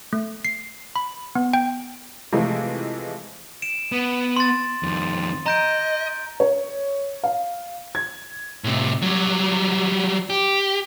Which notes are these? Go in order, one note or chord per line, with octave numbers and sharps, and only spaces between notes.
A3
C7
B5
B3
G5
C3 E3 F3 G#3 A3
D7 E7
B3
C6 A6
F2 D#3
D#5 A#5 G6 D7
C#5
F5
G#6
A2 C3
F#3 G3
G4